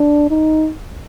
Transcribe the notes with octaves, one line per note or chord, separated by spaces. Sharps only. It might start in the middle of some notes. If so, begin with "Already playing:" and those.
Already playing: D4
D#4